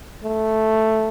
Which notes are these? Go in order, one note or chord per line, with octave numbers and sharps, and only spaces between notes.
A3